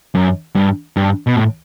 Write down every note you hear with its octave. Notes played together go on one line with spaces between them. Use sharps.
F#2
G2
G2
B2
A2